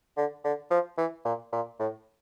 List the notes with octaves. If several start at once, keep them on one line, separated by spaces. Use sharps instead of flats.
D3
D3
F3
E3
A#2
A#2
A2